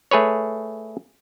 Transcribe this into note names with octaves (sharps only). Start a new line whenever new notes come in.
A3 G#4 B4 C#5